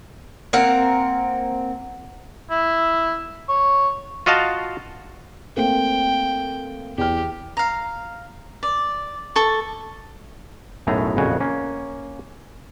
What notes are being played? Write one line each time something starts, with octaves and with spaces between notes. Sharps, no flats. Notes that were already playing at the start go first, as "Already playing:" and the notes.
A#3 C4 A#4 F#5
E4
C#5
F4 F#4 D#5 F5 A5
A3 A#3 C4 G5
E2 G4 F6
F5 A#5
D5
A4 C#6
B1 F#2 A2 A3 G#4 A#5
A#1 F2 C#3 F#4 G#5
A#3 C#4